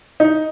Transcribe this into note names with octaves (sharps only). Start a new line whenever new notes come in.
D#4